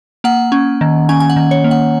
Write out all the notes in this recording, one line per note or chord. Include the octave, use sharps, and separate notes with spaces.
A#3 F#5
C#4
D#3
C#4 G#5
G#5
F#5
D#3
C#5
A#3
F#5